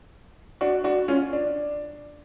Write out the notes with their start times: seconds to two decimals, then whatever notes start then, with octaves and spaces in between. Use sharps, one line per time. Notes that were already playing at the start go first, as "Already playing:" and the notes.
0.61 D4 F#4
0.84 D4 F#4
1.08 C#4 F4
1.33 D4